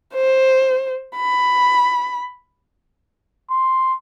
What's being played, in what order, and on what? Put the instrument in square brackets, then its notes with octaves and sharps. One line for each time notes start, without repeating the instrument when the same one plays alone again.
[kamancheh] C5
B5
[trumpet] C6